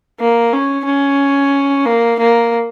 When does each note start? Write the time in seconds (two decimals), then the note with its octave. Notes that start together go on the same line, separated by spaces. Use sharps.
0.20 A#3
0.53 C#4
0.86 C#4
1.86 A#3
2.19 A#3